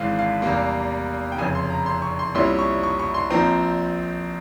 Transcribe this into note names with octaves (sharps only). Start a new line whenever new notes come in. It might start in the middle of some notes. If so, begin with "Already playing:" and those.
Already playing: G#1 G#2 E3 G#3 C4 F5
F5
E2 C3 G3 A#3
G5
F1 F2 C#3 G#5
C6
A#5
C6
C#6
C6
C2 A#2 G3 C#4 E4 C6
C#6
C#6
C#6
C6
A#1 A#2 F3 C4 A#5